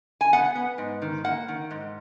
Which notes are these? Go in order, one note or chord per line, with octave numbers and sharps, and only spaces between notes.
G#5
B3 F#5
B3
G#2
D#3
A#3 F#5
D#3
G#2